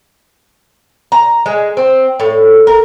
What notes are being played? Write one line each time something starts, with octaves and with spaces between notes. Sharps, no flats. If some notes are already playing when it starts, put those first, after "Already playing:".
A#5
G#3
C4
A2
A#4